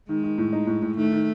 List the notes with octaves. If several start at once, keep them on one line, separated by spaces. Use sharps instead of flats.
D#3 G#3
D#3
A2
D#4
A2
A2
D#3 A3
D#3